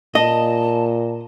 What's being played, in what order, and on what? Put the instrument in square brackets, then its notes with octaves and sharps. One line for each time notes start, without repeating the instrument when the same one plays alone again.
[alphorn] A#2 [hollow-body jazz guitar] D#5 [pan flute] A5